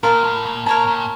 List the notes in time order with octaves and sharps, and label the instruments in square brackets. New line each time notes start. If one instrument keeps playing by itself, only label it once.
[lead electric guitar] A#2 [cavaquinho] A#4 F5 A5
[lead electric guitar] A2
A#2
[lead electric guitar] A#2 [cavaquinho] A#4 C#5 A5
[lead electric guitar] A#2